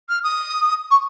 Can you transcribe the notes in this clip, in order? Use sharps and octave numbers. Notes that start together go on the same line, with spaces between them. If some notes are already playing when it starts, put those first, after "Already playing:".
F6
D#6
C#6